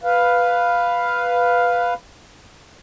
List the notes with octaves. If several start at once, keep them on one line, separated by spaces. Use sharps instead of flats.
B4 F5